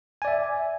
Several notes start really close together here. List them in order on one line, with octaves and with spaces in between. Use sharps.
G#5 D5 E5